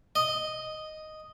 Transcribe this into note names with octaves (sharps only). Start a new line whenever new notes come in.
D#5